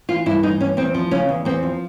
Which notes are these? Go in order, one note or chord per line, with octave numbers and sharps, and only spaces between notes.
E3 F4
G2 E4
E3 D#4
G2 C#4
E2 C4
F3
C#3 C#4
E2
E2 C4
F3